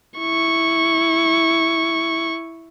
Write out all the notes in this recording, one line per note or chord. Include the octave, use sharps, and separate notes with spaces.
E4 C#6